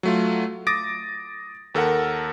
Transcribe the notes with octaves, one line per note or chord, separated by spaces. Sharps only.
F#3 A3 F4
D6 D#6 A6 A#6 D7
D#2 A4 A#4 F#5